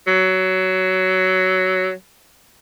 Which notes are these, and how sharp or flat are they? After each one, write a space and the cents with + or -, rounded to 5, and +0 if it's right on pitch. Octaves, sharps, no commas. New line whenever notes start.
F#3 +15